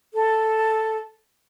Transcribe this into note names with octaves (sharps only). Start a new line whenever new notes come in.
A4